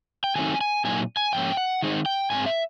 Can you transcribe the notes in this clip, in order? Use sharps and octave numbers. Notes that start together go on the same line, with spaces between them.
G5
D#3 F#3 A3 C4 D#4 G#5
G#5
A#2 F#3 A#3 D#4 G#5
G#5
G#2 F3 A#3 C#4 G5
F#5
D#3 G#3 C4 D#4
G5
G#2 D#3 G#3 C4 G#5
E5